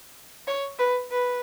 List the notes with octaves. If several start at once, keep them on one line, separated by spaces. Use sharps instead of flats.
C#5
B4
B4